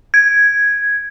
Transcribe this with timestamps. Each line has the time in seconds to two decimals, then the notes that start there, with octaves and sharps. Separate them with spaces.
0.14 G#6